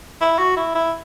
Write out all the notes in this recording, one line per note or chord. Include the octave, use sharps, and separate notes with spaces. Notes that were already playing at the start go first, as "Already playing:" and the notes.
E4
F#4
E4
E4